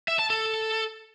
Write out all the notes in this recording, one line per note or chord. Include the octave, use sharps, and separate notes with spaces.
E5
A5
A4